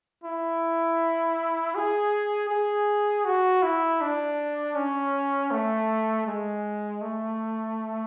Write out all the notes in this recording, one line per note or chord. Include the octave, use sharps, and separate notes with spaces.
E4
G#4
G#4
F#4
E4
D4
C#4
A3
G#3
A3